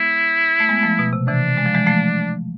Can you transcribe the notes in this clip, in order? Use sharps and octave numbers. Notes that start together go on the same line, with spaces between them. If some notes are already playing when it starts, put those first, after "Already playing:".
Already playing: G#3 B3 E4
A3
G#3 B3
F3 A3
B2
C3
C3 E3 D4
G#3
F3
E3 G#3
F3 A3